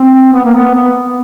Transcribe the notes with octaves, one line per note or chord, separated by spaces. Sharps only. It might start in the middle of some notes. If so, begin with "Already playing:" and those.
Already playing: C4
B3
A#3
B3
B3